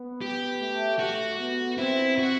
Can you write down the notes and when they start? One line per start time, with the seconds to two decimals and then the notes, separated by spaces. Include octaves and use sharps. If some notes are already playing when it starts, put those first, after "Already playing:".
Already playing: B3
0.21 G4
0.60 A3
0.99 F#4
1.39 B3
1.78 C4 E4
2.19 F#4